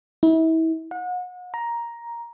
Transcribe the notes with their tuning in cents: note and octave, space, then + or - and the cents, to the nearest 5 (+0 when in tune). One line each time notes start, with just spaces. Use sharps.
E4 -35
F#5 -35
A#5 +10